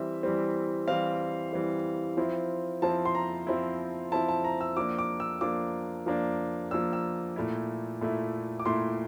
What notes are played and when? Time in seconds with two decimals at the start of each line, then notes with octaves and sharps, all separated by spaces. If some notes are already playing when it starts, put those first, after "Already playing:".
Already playing: E3 G3 C4 E5
0.23 E3 G3 C4
0.88 E3 G3 C4 F5
1.53 E3 G3 C4
2.17 F3 C4 E4
2.82 F3 C4 E4 A5
3.05 C6
3.15 A#5
3.47 F3 C4 E4
4.12 F3 C4 E4 A5
4.28 A5
4.44 A#5
4.61 E6
4.77 F3 A#3 D4 D6
4.98 D6
5.20 E6
5.41 F3 A#3 D4 D6
6.06 F3 A#3 D4
6.71 F3 A#3 D4 E6
6.93 E6
7.36 A#2 A3 E4
8.01 A#2 A3 E4
8.60 D6
8.66 A#2 A3 E4 C6